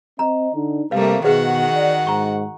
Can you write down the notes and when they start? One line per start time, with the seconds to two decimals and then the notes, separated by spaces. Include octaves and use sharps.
0.19 C4 D#5 A#5
0.54 D3 D4 D#4
0.91 C3 G3 A3 A#3 B4 F5
1.25 B2 D#3 F#4 G#4 B4 C5 F#5
1.72 D5
2.07 G#2 A#5 C#6